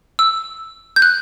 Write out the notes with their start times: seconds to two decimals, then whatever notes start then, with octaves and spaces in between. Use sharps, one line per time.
0.19 E6
0.96 G6
1.02 F#6